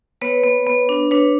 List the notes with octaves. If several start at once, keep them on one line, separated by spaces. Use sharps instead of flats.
B3 B4 C#5
B3
B3
D4
D4 B4 C#5